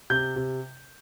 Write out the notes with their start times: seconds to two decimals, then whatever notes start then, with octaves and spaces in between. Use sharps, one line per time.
0.10 C3 G6
0.36 C3